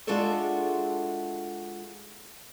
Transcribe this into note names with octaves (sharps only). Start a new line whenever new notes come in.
G#3 D4 F4 F#4 A4 E5